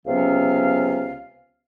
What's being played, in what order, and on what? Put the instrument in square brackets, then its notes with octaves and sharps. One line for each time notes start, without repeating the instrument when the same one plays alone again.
[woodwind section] C#2 C3 F#3 B3 C#4 F5